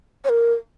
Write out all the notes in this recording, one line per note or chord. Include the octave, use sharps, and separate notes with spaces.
C#5
A#4